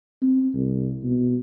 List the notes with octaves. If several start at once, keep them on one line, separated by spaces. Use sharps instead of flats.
C4
C2
B2